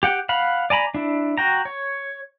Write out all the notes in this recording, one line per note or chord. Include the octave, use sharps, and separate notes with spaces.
G4 F#5 G5
F5 F#5 B5
D5 G#5 A#5 B5
D4 E4
F#4 G5 A#5
C#5